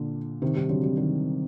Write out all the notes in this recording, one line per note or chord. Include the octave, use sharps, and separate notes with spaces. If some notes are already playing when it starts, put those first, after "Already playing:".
Already playing: A#2 D3
C3 D#3
D#3 G3
D3 F#3
G3
D#3 G3